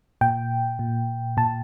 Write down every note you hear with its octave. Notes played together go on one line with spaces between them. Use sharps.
A#2 G5
A#2
A#2 A5